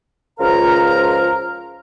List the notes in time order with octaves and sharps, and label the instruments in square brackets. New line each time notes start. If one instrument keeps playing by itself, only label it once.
[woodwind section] C#2 F3 A#4 F5 A#5